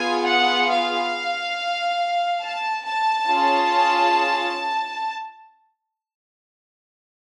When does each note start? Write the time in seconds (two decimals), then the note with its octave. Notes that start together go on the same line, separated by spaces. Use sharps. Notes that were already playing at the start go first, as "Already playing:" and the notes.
Already playing: B3 F4 G#4 G#5
0.25 F#5
0.69 F5
2.41 A5
2.85 A5
3.28 C#4 F4 G#4